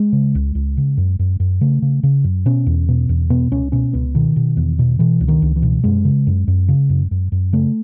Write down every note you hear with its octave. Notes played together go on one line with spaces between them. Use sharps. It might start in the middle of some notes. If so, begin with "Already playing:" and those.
Already playing: G#3
C#3
C#2
C#2
C#3
F#2
F#2
F#2
C#3 A3
C#3
C#3
F#2
B2 C#4
E2
B2
E2
B2 B3
C#2 C#4
B2 C#4
C#2 B3
B2 D#3
B2
E2
B2
B2 E3
C#2
D#3
C#2
E3
B2
F#2 G#3
C#3
F#2
F#2
C#3
F#2
F#2
F#2
C#3 A3